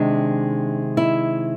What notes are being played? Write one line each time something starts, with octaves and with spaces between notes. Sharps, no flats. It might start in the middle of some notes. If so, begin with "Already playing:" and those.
Already playing: C3 D#3 G#3 D4
E4